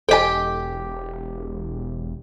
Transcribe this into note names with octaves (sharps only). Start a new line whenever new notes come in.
E1 G4 A4 D#5 G5 G#5